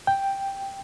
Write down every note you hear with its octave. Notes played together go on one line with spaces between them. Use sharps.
G5